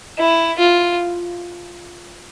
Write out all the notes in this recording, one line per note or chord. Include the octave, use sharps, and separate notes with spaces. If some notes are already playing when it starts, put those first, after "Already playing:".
E4
F4